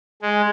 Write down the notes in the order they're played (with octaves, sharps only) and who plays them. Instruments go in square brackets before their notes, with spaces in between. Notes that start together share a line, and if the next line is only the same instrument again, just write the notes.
[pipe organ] G#3